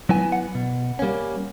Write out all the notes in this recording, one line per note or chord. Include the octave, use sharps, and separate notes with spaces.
F#3 B3 E4 G#5
F#5
B2
G3 A#3 C#4